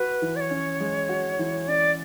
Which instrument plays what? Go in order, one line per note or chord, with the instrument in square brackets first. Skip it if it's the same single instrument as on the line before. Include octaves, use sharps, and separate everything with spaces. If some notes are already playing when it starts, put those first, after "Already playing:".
Already playing: [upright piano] F#4 [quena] B4
[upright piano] E3
[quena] D5
C#5
[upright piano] C#4
G#3
F#4
E3
[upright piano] C#4 [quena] D5